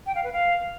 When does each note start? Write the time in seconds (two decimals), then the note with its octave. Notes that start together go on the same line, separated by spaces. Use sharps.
0.06 G5
0.15 F5
0.24 B4
0.33 F5